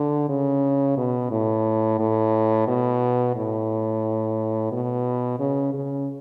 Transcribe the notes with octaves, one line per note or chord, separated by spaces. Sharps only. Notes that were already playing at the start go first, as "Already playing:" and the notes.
Already playing: D3
C#3
B2
A2
A2
B2
A2
B2
C#3
C#3